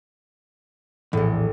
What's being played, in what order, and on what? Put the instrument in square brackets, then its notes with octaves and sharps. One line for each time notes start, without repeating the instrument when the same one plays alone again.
[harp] A#1 A2 [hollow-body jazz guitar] E2